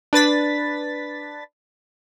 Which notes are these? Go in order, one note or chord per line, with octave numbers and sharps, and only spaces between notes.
D4 B4 A6 B6